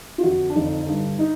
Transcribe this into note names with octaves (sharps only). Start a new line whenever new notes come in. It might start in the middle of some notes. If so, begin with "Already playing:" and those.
F4
F2 D3 F#4
D4
F2 D3 D#4
G2 D3
D#4